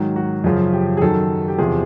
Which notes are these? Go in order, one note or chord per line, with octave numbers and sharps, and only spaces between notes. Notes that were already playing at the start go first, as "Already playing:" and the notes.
Already playing: G#2 D#3 F#3
F#4
F#2 C#3 F3
G4
G#4
F#2 D#3 F#3 A4
G4
E2 C3 F3 G#4